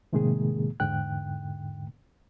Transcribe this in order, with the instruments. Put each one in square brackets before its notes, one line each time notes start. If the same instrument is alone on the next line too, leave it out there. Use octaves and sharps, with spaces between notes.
[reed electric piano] A2 C3 D#3 G#3 A#3 G#4
E2 G#2 D3 G5 F#6